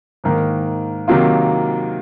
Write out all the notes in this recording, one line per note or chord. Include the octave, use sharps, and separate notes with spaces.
G#2 D#3 A#3
C3 D#3 F#3 A#3 F4